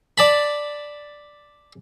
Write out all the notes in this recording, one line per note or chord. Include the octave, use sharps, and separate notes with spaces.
D5 A5 B5